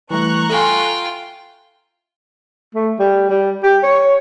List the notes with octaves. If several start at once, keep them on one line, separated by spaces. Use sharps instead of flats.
E3 G3 A3 A#5 C#6 F#6
F4 A4 E5 F5 G5 G#5
A3
G3
G3
G4
C#5